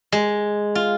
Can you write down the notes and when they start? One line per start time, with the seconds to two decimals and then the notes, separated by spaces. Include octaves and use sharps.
0.12 G#3
0.75 F4